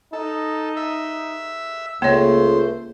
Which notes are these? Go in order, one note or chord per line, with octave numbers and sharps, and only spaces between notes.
D#4 A4
E5
C#2 A3 A#3 C5 C#5